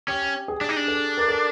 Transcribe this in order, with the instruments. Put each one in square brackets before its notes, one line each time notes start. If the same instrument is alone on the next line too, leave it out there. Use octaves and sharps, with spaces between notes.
[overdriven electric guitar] C#4 [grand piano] G4
[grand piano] G#4
[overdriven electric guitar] D4
D#4
D4
[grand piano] A4
A#4
A4